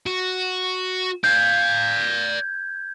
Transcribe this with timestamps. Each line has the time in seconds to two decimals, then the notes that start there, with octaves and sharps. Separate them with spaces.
0.06 F#4
1.24 D5 F5 G6 G#6